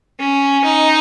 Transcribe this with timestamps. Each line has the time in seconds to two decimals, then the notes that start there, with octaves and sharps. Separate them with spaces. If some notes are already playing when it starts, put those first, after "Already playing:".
0.20 C#4
0.64 D#4